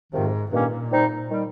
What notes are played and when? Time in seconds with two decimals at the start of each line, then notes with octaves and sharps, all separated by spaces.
0.13 F2 G#2 C3 D#3
0.51 G2 A#2 D#3 A#3 C#4
0.91 C3 D#3 G3 C4 D#4
1.30 D#3 G3